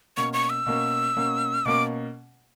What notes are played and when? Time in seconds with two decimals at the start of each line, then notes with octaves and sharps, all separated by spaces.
0.17 B2 A#3 C#4 C#6
0.33 C#6
0.50 E6
0.66 B2 A#3 C#4
1.17 B2 A#3 C#4
1.65 B2 A#3 C#4 D6